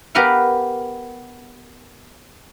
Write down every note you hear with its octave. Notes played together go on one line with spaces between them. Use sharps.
B3 G4 A#4 B4 F5 F#5